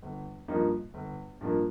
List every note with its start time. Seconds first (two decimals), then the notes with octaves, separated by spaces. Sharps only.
0.03 G1
0.48 G2 F3 A#3 D#4
0.94 G1
1.41 G2 F3 A#3 D#4